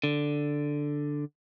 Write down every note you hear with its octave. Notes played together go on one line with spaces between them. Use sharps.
D3